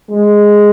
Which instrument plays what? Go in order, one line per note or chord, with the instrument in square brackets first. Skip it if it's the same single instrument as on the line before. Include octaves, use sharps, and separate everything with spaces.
[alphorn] G#3